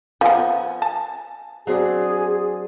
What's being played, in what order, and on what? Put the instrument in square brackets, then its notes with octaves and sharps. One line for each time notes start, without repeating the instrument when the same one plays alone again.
[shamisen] F3 B3 [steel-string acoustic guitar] G#5
[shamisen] A5
[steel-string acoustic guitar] F#3 C4 D4 [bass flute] G#4